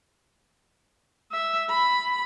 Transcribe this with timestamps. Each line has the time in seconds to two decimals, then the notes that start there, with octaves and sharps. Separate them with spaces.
1.32 E5
1.70 B5